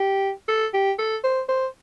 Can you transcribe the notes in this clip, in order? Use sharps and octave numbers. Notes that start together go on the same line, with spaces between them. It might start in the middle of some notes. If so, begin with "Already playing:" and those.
Already playing: G4
A4
G4
A4
C5
C5